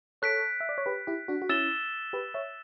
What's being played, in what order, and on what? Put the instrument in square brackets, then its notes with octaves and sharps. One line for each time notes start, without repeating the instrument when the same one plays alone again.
[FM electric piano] A4 C#5 [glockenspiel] F#6 B6 D7
[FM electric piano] E5
D5
C#5
G4 B4
E4 G4
D4 F#4
F#4
[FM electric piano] C#4 E4 [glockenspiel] E6 A6 E7 G7
[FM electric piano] G4 B4
C#5 E5